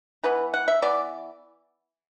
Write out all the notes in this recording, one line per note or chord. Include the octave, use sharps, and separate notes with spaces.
E3 B3 B4
F#5
E5
E3 B3 D5